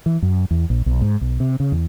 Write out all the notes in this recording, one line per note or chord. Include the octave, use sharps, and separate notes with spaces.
E3
F#2
E2
A#1
B1
G#2
B1
C3
C#3
E2